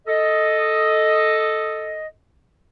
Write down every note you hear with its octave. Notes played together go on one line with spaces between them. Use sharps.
A4 D#5